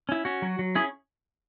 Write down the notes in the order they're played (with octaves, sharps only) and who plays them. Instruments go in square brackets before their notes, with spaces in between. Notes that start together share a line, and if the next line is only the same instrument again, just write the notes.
[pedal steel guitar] C#4 E4
C#4 F#4
F#3
F#3
C#4 E4 G#4